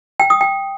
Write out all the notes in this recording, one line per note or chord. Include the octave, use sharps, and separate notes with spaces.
G5
D#6
G5